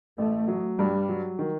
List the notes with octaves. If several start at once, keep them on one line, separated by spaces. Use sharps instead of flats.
A1 A3
F#3
G2 G3
F#3
D#3